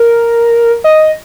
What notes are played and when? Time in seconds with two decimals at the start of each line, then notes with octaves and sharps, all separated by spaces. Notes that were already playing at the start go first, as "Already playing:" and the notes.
Already playing: A#4
0.84 D#5